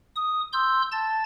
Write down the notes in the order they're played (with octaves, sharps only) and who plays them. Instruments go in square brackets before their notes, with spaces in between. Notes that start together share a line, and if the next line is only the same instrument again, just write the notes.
[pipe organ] D#6
C6 E6 G6
A5 A6